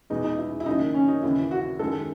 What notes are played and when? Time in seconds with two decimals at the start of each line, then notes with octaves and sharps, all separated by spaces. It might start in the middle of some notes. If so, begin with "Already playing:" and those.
0.10 E2 B2 G#3 D#4
0.24 D#4
0.38 E4
0.60 E4
0.66 F#1 F#2 D#3 D#4
0.94 C#4
1.08 D#4
1.23 D#2 C#3 E3 E4
1.51 F#4
1.79 F#2 D#3 G#3 A4